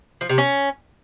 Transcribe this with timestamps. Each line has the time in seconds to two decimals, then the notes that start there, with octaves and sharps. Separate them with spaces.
0.21 F3
0.29 C3
0.38 C#4